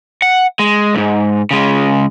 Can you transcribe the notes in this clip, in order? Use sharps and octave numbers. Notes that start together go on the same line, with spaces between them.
F#5
G#3
C#2 G#2
C#3 G#3